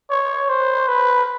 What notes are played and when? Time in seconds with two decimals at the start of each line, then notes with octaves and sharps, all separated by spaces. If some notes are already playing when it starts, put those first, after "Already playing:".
0.10 C#5
0.49 C5
0.88 B4